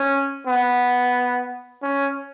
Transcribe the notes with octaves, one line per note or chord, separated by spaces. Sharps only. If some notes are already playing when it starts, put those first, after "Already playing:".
Already playing: C#4
B3
C#4